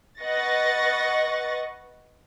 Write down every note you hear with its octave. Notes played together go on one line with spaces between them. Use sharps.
B4 D#5 F#5 C#6 A6 A#6